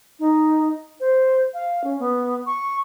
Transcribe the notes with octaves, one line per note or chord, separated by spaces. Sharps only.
D#4
C5
F5
C#4
B3
C#6